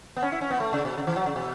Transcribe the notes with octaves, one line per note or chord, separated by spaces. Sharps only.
B3
C#4
E4
C#4
B3
A3
C#3
B2
C#3
E3
F#3
C#3
B2